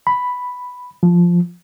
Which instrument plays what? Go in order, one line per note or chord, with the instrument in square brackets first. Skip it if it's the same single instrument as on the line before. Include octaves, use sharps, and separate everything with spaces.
[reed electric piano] B5
F3